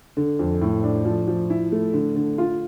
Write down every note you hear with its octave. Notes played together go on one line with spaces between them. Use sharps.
D3
F2
A2
D4
F3
F3
E4
A3
D3
D3
F4